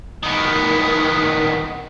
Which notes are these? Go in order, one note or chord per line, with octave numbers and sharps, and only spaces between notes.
D#3 B3